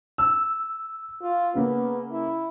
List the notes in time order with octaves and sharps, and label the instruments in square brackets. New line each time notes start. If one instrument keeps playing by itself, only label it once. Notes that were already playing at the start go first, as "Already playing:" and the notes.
[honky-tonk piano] E6
[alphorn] F4
[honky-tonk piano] C#3 A#3 [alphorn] B3
[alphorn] E4